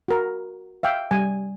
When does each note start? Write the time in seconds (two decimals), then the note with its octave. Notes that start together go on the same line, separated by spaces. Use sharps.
0.08 F#4 A#4
0.83 E5 F5 G5
1.11 G3 G#5